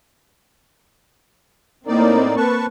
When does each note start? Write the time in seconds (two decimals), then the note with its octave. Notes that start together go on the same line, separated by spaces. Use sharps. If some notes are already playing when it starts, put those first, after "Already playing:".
1.87 A2 A#3 C4 D#4 D5
2.37 B4 A5 C#6